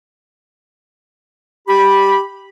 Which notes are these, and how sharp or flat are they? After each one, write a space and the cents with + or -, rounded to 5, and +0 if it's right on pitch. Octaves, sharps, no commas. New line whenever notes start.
G4 +0 B5 -10